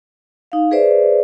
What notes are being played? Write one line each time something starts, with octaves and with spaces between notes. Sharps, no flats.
D#4 F5
G#4 B4 C5 D5 E5